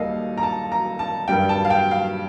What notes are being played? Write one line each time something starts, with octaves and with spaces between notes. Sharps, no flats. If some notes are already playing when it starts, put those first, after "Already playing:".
Already playing: D#2 D#3 G3 A#3 A4 D#5 F5
A#5
A5
A#5
A5
G2 D#3 G3 G5
A5
F5
G5
F5